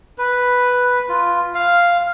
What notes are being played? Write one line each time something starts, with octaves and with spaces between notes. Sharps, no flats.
B4
F4
F5